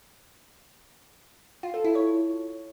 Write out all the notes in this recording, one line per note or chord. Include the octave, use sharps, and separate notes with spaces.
F4
A4
E4
C#5